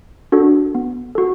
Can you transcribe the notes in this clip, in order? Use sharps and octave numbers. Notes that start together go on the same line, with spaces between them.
D4 F#4 A4
B3
F#4 A4